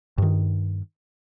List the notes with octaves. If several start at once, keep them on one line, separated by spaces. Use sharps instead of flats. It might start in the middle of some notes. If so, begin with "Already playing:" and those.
G2 D#3